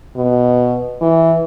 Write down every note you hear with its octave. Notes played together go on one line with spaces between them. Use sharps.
B2
E3